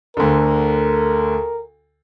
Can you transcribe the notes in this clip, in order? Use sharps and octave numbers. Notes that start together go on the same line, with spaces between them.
D2 D3 A#4